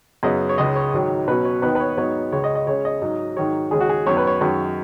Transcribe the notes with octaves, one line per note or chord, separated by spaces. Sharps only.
F#2 C#3 B3 D#4 D#5
C#5
C#2 C#3 G#3 D#4 D#5
C#5
G#2 D#3 F#3 D#4
B2 F#3 C#4 B4
C#5
D#2 D#3 B3 D#4 B4
B4
C#5
G#2 F#3 B3 D#4 C#5
C#2 C#3 G#3 C#5
D#5
D#5
C#3 G#3 C#4 C#5
D#5
G#2 F#3 D#4
G#2 D#3 F#3 C#5
D#2 C#3 G#3 G#4
F#4
G#4
F#2 D#3 B3 C#5
B4
C#5
F#2 D#3 G#3